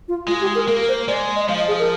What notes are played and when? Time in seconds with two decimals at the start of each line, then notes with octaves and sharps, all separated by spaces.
0.08 F4
0.28 G#3 F4
0.41 G4
0.55 A#4
0.68 A#3 A#4
0.89 C5
1.08 G#3 D5
1.36 D#5
1.49 F3 F5
1.58 D#5
1.68 G#4
1.79 A#4